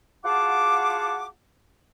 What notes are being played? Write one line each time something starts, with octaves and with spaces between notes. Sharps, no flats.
F4 F#4 G#4 F#5 A5 D6